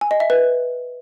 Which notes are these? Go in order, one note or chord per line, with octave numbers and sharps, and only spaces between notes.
G#5
D#5
E5
B4